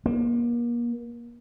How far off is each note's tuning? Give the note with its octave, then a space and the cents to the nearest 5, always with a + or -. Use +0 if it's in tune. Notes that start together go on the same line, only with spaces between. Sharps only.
A#3 +35